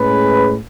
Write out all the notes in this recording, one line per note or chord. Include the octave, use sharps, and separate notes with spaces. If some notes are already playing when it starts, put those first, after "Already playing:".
Already playing: A2 G#3 C#4 G#4 B4